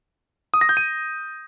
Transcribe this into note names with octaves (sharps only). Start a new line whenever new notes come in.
D#6
A#6
G6
D#7